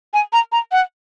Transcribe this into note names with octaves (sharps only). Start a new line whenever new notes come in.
G#5
A#5
A#5
F#5